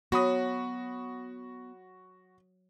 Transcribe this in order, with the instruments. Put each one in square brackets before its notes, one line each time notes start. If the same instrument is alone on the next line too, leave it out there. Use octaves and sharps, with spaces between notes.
[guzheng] F#3 [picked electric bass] B3 [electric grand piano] F#4 B5 D#6